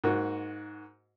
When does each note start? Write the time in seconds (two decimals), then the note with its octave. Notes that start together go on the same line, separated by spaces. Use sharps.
0.04 G#2 A#3 F#4